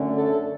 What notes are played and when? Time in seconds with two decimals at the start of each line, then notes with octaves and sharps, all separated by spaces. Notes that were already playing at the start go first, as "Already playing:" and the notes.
Already playing: F#2 D3 A3 C#4
0.11 A4